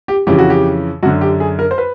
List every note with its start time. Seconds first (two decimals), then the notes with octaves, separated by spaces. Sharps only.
0.08 G4
0.27 F2 C#3 E3 G4
0.38 F#4
0.50 G4
1.03 F#2 D3 F#4
1.21 G4
1.40 G#4
1.59 A#4
1.71 C5
1.78 B4